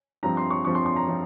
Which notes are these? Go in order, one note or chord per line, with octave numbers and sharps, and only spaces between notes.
G2 F3 C4 A#5
C6
C#6
G2 F3 C4 C#6
C6
C6
A#5
F3 C4